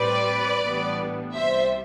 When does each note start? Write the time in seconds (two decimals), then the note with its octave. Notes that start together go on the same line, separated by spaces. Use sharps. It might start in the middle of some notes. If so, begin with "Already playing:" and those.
Already playing: A2 G3 C4 B4 D5
0.60 A1 A2 G3 B3 D4
1.35 C2 C3 G3 C5 E5